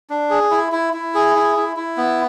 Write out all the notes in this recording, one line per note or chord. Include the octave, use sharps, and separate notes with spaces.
D4
G#4
E4
E4
E4
G#4
E4
E4
E4
B3